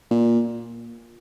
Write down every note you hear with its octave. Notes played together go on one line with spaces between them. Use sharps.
A#2